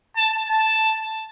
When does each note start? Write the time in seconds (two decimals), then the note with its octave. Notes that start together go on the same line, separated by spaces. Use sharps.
0.16 A5
0.49 A5